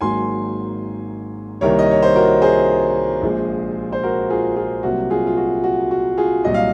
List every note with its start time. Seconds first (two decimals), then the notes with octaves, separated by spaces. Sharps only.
0.01 G#1 G#2 F#3 A#3 G#5 C6
1.61 C2 C3 D#3 A#3 A#4 C#5
1.79 D#5
1.91 C#5
2.02 C5
2.15 F#4 A#4
2.42 G#4 C5
3.22 A#1 A#2 F3 G#3
3.92 C5
4.03 F#4 A#4
4.30 F4 G#4
4.56 F4 G#4
4.83 C2 C3 F#3 A#3 F#4
5.10 F4 G#4
5.27 F4
5.37 F#4
5.64 F#4
5.91 F#4
6.17 F4 G#4
6.44 C2 A#2 F#3 D#5
6.54 F5